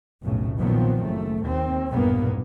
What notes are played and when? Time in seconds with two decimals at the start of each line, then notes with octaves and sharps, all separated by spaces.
0.23 F1 B1 A2 C#3
0.59 A#2 D#3 F3 F#3 B3 C4
1.04 F#1 A3
1.46 D#2 C4
1.89 B1 E2 G2 A#2 A#3 B3